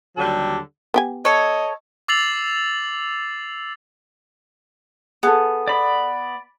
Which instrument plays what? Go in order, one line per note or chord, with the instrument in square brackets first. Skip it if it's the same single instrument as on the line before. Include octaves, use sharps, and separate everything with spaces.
[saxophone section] D#2 D3 F#3 G3 A4
[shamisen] B3 G4 G#5
[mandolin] A4 C#5 [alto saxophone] D#5
[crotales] D6 E6 A6 C7 F7 F#7
[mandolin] B3 [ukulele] G#4 A4
[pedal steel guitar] D5 B5